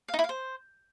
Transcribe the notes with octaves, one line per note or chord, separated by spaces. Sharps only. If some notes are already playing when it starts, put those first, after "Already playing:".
F5
D#4
E4
F5
C5